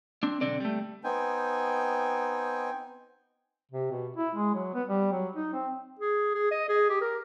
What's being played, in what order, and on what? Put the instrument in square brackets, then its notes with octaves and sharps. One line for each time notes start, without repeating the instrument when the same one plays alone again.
[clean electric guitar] C4 D4
B1 D3 C4 D5
G3 A3
[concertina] B3 C4 D#4 G5 G#5
[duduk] C3
B2
E4
G#3
F#3
B3
G3
F#3
D#4
C4
[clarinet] G#4
G#4
D#5
G#4
G4
A#4